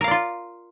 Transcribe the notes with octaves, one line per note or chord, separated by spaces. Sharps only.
F4 A#4 D5 F5